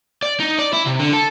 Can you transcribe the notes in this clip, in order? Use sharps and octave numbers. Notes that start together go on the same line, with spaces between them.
D5
D#4
D5
E4
C3
D3
A4